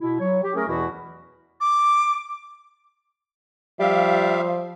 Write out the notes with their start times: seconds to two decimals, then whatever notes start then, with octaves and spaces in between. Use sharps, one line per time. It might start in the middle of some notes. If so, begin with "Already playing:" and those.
0.01 B2 E4
0.20 F#3 C#5
0.43 G4
0.55 A3 C#4 G#4 A#4
0.68 E2 B2 E3 E4 F#4
1.61 D6
3.80 F3 G3 E5 F5